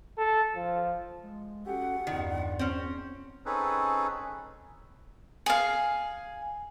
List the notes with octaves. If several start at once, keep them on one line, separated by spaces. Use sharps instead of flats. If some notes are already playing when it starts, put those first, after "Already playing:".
A4
F3
G#3
C#4 F#4 G4 A4 F#5
E2 G2 D#3 F4 D5
C4 C#4
C4 C#4 D#4 G#4 A4 B4
G#4 F5